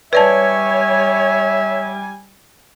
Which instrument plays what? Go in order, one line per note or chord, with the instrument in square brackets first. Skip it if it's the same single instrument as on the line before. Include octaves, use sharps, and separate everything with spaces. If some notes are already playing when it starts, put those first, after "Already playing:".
[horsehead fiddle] G3 G#5 [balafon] B4 D5 A5 [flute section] C#5 [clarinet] E5